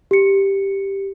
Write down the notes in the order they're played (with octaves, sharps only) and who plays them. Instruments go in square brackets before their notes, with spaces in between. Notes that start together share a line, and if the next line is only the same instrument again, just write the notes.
[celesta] G4 C#7